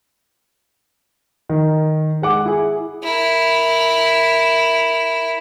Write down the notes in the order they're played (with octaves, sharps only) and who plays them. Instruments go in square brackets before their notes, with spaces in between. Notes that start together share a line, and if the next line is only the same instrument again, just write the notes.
[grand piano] D#3
G#3 F#5 D6
E4 G#4
[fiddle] E4 A#4